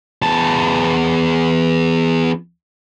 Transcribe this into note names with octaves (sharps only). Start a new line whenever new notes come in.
E2 A5